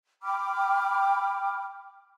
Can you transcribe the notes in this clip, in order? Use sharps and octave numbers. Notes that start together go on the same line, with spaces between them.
G5 B5 D6 F6